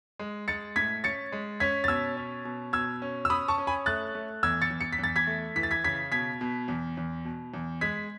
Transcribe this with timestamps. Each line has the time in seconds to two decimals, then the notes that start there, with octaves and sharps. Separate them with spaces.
0.19 G#3
0.48 G#3 A6 C#7
0.76 A2 G#6 B6
1.04 C#4 A6 C#7
1.32 G#3
1.60 C#4 G#6 B6
1.84 A6
1.88 B2 E6 G#6
2.17 C#4
2.45 B2
2.73 B2 E6 G#6
3.02 C#4
3.25 E6
3.29 C#4 B5 D#6
3.48 A5 C#6
3.58 C#4
3.67 G#5 B5
3.86 A3 F#6 A6
4.15 A3
4.43 E2 E6 G#6
4.62 A6 C#7
4.70 E2
4.81 C#7
4.93 B6
4.99 E2 A6
5.16 G#6 B6
5.27 A3
5.56 E3 B6
5.63 A6
5.71 G#6 B6
5.84 C#3 G#6 B6
6.12 B2 G#6 B6
6.41 B2
6.68 E2
6.97 E2
7.25 B2
7.54 E2
7.81 G#3 G#6 B6